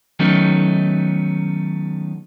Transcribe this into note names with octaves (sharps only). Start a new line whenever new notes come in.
D#3 F#3 A3 B3 C#4 D#4